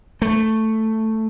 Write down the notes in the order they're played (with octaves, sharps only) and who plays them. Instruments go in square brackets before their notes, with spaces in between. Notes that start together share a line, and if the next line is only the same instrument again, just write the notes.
[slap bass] A3